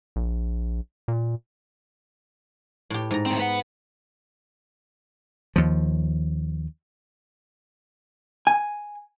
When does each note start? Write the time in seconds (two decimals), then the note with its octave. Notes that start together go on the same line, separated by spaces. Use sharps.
0.16 A#1
1.08 A#2
2.90 A2 G4
3.11 G#2 A#5
3.26 A2 C4
3.40 B4 F#5
5.56 D#2 F3
8.47 G#5